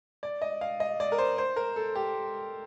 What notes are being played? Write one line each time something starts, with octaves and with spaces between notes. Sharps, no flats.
D5
D#5
F5
D#5
D5
A#4
C5
C5
A#4
A4
G4